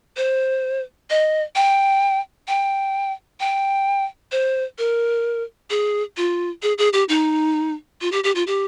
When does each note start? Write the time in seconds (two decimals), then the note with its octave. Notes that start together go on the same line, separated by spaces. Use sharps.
0.17 C5
1.10 D#5
1.56 G5
2.48 G5
3.40 G5
4.32 C5
4.78 A#4
5.70 G#4
6.17 F4
6.62 G#4
6.78 G#4
6.93 G4
7.09 D#4
8.01 F4
8.12 G4
8.24 G4
8.35 F4
8.47 G4